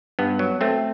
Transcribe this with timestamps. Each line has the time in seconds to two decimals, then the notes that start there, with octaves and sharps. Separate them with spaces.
0.19 G2 B3
0.39 F#3
0.61 A3 C4